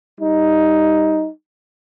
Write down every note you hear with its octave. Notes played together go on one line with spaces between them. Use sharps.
G3 D#4